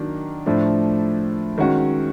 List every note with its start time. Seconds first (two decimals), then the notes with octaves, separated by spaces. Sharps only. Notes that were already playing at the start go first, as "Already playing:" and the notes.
Already playing: D#3 F#3 A#3 D4
0.46 A2 F3 A3 D4
1.58 D#3 G#3 C#4 F#4